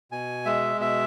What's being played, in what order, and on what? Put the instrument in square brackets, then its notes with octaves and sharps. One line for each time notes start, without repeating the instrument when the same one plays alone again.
[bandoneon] B2 G#5
G#3 E5
B2 E5